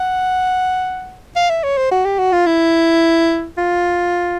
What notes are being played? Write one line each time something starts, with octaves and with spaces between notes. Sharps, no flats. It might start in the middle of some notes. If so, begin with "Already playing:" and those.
Already playing: F#5
F5
E5
C#5
C5
F#4
G4
F#4
F4
E4
F4